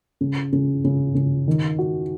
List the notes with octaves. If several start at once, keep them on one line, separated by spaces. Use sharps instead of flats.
C#3
C#3
C#3
C#3
D#3
F#4